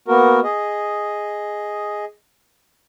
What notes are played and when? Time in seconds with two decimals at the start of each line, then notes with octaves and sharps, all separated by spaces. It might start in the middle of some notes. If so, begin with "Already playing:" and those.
0.08 A#3 B3 F#4 A#4
0.44 G#4 D#5